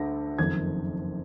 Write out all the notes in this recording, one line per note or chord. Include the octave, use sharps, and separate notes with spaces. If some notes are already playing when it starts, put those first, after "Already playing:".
Already playing: D2 D3 A#6
F#1 F2 D#3 G#6